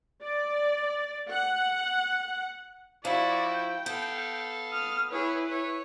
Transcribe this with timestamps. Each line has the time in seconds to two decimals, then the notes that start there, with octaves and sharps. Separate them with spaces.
0.23 D5
1.29 F#5
3.05 F3 E4 F#4 D5
3.49 G5
3.86 B3 A4 F5
4.72 D#6 F6
5.11 E4 G#4 B4 C#5
5.48 C#5